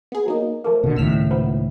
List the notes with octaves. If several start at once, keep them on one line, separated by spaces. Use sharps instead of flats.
B3 G#4
F#3 A#3 D#4
F3 A3 A#3
B2 D3
C#2 A2 D#3 E6 F6 B6
A#2 F3 B3